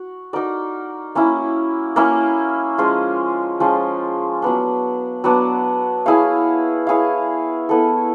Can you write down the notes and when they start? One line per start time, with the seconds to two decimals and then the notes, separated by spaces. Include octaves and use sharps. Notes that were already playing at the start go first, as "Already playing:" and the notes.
Already playing: F#4
0.33 D#4 F#4 A#4 D5
1.15 A#3 C#4 E4
1.96 A#3 C#4 E4
2.78 F3 G#3 C#4 F4
3.60 F3 G#3 C#4 F4
4.42 F#3 B3 D4
5.24 F#3 B3 D4
6.06 E4 G#4 C#5 F5
6.87 E4 G#4 C#5 F5
7.69 B3 E4 A4